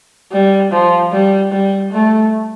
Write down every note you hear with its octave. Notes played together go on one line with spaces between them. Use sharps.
G3
F3
G3
G3
A3